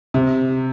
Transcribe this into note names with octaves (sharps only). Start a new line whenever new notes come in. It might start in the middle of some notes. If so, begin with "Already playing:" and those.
C3